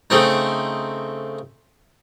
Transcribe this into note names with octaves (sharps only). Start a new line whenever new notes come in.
C#3 A3 C4 D#4